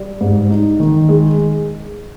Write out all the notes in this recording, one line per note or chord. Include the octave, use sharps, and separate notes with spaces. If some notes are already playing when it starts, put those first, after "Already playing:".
Already playing: G3
G#2
D#4
D#3
G#3